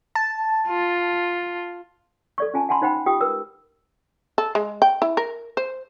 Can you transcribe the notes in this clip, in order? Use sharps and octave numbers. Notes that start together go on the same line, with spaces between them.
A5
F4
A4 D5 C#6
C#4 F4 G#5 A5
F#5 G#5 A5 B5 C6
D#4 C5 F#5 G5 B5
F4 G4 G5 D#6
A#4 B4 E6
A4
G#3
G5
E4
A#4
C5